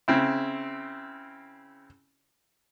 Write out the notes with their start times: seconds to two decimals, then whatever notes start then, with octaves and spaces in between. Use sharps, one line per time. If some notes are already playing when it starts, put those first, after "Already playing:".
0.08 C#3 C4 E4